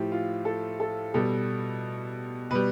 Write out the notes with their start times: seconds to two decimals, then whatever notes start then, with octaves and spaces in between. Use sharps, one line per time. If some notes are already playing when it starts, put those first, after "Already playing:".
Already playing: A2 F3 G4
0.12 F4
0.45 A4
0.80 A4
1.14 B2 G3 A4
2.51 B2 G3 B4